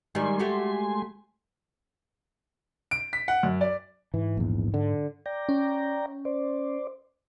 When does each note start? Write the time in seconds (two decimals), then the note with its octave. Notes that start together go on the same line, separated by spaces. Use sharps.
0.15 D#3 G3 G#3 G#5 C6
0.39 A3 F#4 G4
2.91 D7
3.13 B6
3.28 F#5
3.43 F#2
3.61 D5
4.14 G#2 E3
4.37 A#1 E2
4.74 D3
5.26 D5 G5 A#5
5.49 C#4
6.25 C5 D5